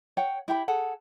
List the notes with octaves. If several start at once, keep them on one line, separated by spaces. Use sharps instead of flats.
C#5 F#5 G5
E4 G4 G5 B5
G#4 A4 F#5